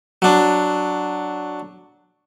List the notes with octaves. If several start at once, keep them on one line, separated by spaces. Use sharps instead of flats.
F#3 D4